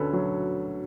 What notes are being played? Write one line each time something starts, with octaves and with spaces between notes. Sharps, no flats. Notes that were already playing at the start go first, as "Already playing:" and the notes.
Already playing: D2 D3 A3 C#4 A4 B4
F#3